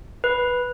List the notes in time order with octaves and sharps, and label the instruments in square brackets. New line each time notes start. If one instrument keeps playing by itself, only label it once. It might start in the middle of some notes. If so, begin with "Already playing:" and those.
[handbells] B4